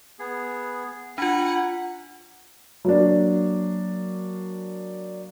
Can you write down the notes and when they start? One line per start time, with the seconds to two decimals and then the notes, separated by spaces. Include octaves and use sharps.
0.19 B3 G#4
1.18 D4 F4 F#5 G#5 B5
2.85 F#3 A#3 D4